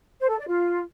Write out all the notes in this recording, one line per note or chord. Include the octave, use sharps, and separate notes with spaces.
C5
A4
D5
F4